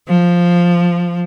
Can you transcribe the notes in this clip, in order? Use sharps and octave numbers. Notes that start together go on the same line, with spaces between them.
F3